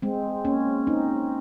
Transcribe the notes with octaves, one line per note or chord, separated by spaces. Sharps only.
G#3 C4
A#3 C#4
C4 D#4